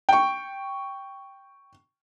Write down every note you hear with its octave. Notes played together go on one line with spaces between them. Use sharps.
G5 C#6